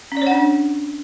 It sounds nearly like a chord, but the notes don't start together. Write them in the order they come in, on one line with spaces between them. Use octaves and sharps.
C#4 D5 C#5 F#5 D4